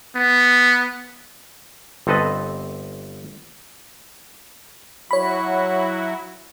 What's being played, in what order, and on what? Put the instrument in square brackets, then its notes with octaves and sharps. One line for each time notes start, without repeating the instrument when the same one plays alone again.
[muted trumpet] B3
[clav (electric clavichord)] G1 C4 A4 B4 D#5 A5
[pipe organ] F#3 E4 F#4 [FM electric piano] C#5 B5